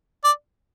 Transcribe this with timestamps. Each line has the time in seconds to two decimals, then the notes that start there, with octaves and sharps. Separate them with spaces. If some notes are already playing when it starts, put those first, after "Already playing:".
0.24 D5